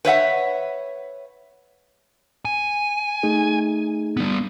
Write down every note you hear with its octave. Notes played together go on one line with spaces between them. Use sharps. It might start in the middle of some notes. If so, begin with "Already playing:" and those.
B4 C#5 E5 F#5
G#5
A3 D#4 G#4
G3 B3